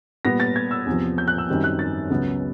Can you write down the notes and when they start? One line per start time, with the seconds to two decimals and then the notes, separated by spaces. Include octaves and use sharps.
0.25 A#2 G3 B3 A#6
0.40 A6
0.56 G#6
0.71 E6
0.86 E2 C3 F3
1.18 G6
1.28 F#6
1.38 E6
1.48 F#2 D#3 G3 C4
1.64 F#6
1.79 A6
2.10 C#2 C#3 F#3 B3